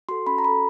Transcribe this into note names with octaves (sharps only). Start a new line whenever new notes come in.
F#4 A4 C6
C#4 B5
A#5
F#4 A4 B5